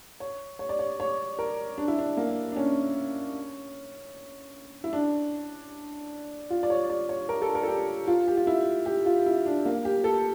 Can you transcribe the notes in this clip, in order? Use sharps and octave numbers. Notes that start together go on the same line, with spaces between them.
C#5
C#5
D5
C#5
C#5
A#4
D4
E4
D4
A#3
D4
C#4
E4
D4
F4
D5
C#5
D5
C#5
A#4
A4
A#4
A4
G4
F4
G4
F4
E4
G4
F4
E4
D4
A#3
G4
A4